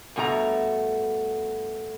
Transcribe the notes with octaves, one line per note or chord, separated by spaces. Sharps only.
G2 B2 A3 F#4 A#5